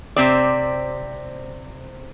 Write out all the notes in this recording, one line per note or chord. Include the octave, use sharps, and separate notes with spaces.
C3 C4 D5